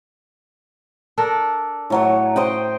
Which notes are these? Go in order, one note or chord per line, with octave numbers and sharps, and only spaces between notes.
D4 A4 A#4
A2 F#3 C#5
C5 D#5 G5